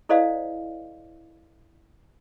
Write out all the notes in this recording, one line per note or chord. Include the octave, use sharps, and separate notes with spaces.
E4 A4 C5 D5 D#5 F5